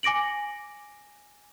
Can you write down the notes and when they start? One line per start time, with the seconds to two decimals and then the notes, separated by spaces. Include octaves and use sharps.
0.03 G#5 D6 A#6 D7 F#7